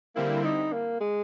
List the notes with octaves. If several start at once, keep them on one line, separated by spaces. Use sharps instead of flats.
D3 G3 A#3 C4 E4
D#4
A#3
G#3